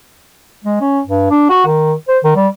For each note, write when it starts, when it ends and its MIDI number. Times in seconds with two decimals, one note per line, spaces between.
0.65 0.78 56
0.81 1.00 61
1.07 1.30 43
1.30 1.46 62
1.50 1.65 66
1.66 1.93 51
2.08 2.18 72
2.24 2.32 51
2.36 2.47 55